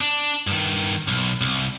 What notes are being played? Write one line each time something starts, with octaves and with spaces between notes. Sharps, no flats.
D4
G2 D#3
B1
C2